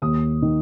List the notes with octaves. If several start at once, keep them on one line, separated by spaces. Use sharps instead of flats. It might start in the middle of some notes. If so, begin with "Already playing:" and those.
D#2 D#6
D#3